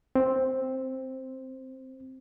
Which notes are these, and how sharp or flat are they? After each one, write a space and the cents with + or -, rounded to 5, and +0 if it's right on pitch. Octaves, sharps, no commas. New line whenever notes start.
C4 +5